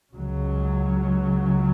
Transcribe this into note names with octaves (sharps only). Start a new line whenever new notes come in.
C#2 C#3 F#3